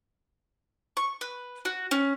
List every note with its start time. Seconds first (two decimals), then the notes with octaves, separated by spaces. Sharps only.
0.97 C#6
1.21 B4
1.65 F#4
1.91 C#4